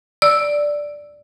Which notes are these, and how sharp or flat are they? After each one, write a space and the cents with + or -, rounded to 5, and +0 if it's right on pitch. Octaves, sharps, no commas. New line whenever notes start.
D5 +0 E6 +0